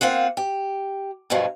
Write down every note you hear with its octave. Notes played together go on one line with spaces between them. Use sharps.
A#3 C4 F4 F#5
G4
G2 B2 D3 F3 F#3